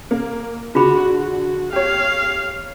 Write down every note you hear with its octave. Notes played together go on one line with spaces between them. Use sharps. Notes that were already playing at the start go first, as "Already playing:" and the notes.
A#3
D3 F4 F#4 G#4 B5
F#4
G4 C#5 F5